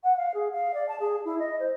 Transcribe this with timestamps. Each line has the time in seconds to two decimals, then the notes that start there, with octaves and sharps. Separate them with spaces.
0.04 F#5
0.17 F5
0.34 G#4
0.53 F5
0.74 D5
0.88 A5
1.00 G#4
1.25 E4
1.39 D#5
1.59 C5